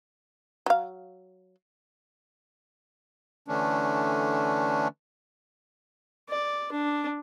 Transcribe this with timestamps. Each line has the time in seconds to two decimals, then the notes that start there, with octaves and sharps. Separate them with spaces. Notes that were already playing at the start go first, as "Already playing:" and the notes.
0.66 F#3 F5
3.48 D3 E3 A3 C#4 D4
6.29 D5
6.72 D4